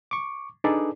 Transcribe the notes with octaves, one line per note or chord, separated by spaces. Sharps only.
C#6 D6
D4 D#4 G#4 A4 B4 D5